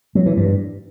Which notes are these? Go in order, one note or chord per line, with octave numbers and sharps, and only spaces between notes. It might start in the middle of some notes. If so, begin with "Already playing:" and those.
F#3
E3
G2